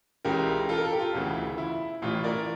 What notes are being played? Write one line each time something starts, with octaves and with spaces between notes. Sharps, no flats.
C#2 C#3 E3 G4 A#4
F4 A4
A#4
A4
G4
F4
E1 D2 C#3 E3
E4
A1 A2 E3 F4
A#4 D5